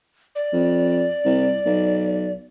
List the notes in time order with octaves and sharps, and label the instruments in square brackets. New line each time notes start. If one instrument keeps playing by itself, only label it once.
[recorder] D5
[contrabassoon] F2
C2
B1